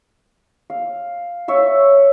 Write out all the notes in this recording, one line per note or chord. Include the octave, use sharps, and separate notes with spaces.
F5
C#5 E5 F5